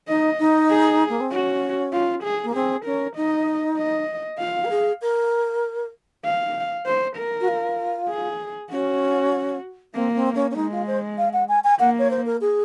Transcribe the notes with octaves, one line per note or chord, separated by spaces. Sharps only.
D#4 D#5
D#4
G#4
A#3
C4
C#4 F#4
F4
G#4
A#3
C4 G#4
C#4 A#4
D#4 D#5
D#5
F4 F5
A#4
G#4
A#4
F5
C5
A#4
F#4
F4
G#4
C#4 F#4
A#3 C4
C4
C#4
C#4
G#3 D#4
F4
C5
F5
F#5
G#5
G#5
A#3 F#5
C#5
C5
A#4
G#4